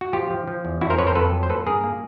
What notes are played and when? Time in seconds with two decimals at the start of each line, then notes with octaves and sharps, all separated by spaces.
0.01 F#4
0.13 F3 F4 G4
0.30 F3
0.47 F3
0.65 E2
0.81 F2 E4 F#4
0.90 A#4 C5
0.98 F2 B4 C#5
1.07 A#4 C5
1.15 F2 A4 B4
1.32 F#3
1.43 C5
1.50 A#3 A4 B4
1.67 G2 G#4 A#4
1.84 A#3